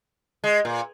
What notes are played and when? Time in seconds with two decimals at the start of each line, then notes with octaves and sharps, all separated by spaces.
0.44 G#3
0.65 A#2